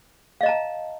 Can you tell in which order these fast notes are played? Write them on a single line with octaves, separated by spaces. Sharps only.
F5 D#5 A#5 A5